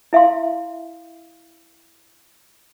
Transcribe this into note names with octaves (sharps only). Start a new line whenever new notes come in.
E4 E5 F5 C6